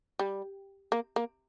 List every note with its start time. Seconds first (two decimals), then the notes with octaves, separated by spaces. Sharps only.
0.19 G3
0.92 A#3
1.16 A#3